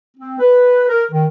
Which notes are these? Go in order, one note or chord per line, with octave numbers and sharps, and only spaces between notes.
C4
B4
A#4
D#3